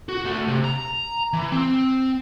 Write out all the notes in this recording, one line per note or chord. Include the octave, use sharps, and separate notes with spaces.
F#4
D2 A3
C3
A#5
E3
C4